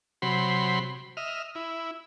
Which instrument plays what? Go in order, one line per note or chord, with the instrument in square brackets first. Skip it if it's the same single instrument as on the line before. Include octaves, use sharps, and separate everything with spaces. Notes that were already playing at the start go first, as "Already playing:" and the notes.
[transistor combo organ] C3 F#3 B5 C6
D#5 E5 F6
E4